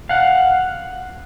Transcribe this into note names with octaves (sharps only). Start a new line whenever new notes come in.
F5 F#5